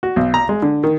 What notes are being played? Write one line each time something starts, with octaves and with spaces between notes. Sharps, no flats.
F#4
B1
A#5
G#3
D3
D#3